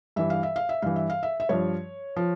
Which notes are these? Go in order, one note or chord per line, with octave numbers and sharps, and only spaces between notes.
G2 E3 E5
F5
E5
F5
E5
G2 E3 F5
E5
F5
E5
E5
G2 F3 C#5
F3